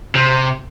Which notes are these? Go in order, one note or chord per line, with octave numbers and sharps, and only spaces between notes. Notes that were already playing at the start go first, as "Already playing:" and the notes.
C3